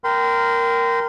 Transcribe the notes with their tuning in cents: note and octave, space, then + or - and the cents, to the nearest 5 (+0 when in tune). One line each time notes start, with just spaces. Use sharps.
A#4 +0 G5 -15 C6 -35